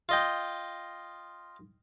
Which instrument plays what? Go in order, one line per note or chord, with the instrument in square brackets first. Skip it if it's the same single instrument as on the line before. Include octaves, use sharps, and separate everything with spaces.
[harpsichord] F4 D#5 G5